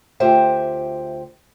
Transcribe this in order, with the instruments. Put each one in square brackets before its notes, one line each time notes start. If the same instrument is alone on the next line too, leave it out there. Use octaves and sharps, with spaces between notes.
[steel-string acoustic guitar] D2 F4 G4 C5 E5 G5